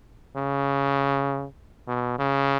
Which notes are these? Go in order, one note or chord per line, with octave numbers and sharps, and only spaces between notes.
C#3
B2
C#3